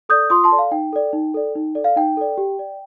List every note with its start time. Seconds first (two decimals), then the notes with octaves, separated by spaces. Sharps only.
0.09 A4 D5 D#6 G6
0.30 F4 C6 D#6
0.44 A5 C6
0.52 A4 D5
0.59 F5
0.71 D#4 G5
0.93 A4 D5
1.13 D#4
1.34 A4 D5
1.55 D#4
1.75 A4 D5
1.84 F5
1.96 D#4 G5
2.17 A4 D5
2.38 G4
2.59 D5